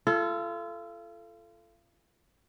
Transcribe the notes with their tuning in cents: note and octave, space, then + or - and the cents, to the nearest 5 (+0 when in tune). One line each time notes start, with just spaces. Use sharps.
F4 -35 A4 +0